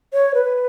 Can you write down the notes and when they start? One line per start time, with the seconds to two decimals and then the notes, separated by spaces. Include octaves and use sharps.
0.13 C#5
0.34 B4